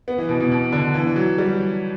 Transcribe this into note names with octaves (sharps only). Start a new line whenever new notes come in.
B3
E3
B2
B2
B2
D3
E3
F#3
G3